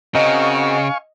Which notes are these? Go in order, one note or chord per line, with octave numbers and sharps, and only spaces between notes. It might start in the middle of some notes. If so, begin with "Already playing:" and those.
C#3 C4 F#4 A#4 D#5 F5 G#5 C#6